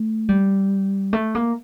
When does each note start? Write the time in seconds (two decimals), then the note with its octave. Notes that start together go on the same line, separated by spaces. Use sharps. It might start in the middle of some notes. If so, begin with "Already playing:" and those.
Already playing: A3
0.29 G3
1.13 A3
1.35 A#3